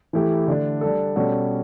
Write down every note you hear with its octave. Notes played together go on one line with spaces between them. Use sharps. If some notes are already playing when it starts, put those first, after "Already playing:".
E3 A3 E4 G4
D3 A3 D4
G3 D4 A4
B2 G3 C#4 F#4 A4